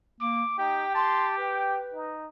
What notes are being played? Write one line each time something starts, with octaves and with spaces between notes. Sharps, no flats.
A#3 D6
D#4 G4 G5
A5 C6
B4 G5
D#4